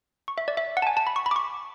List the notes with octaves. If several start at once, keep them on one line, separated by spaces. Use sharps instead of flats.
C#6
E5
D5
E5
F#5
A5
G#5
A5
B5
C#6
B5
D6
C#6